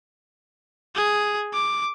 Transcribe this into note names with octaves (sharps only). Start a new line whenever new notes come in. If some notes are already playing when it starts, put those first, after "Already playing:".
G#4
D6